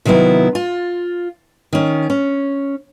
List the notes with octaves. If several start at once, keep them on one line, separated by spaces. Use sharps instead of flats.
C3 D#3 F#3 B3 E4
F4
D#3 C#4
C#4